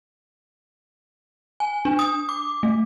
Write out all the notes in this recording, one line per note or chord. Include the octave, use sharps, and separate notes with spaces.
G#5
D4
D#6
D6
A3